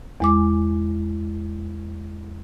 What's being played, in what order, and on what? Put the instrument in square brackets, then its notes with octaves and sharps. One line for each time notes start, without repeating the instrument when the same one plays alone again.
[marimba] E2 G#3 D6